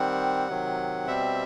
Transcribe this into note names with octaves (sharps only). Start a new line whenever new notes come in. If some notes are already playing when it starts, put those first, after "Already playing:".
Already playing: D#3 G3 C4 F#5
C3 D#3 F#3
B2 G3 C4 E5